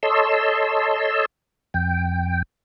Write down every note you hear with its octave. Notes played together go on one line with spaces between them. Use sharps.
A4 C#5 D#5 A5 C6 E6
F2 G5